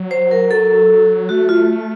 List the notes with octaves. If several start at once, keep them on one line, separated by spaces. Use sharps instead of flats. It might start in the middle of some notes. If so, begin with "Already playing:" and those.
Already playing: F#3
C5
A#4
A4
A3 F#4
F4